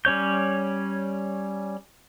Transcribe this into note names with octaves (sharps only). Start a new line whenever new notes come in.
G3 C#4 C#5 G6